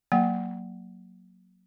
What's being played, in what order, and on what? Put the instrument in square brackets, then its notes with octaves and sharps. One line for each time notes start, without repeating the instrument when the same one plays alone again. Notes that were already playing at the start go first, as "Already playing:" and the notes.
[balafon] F#3 A#3 F#5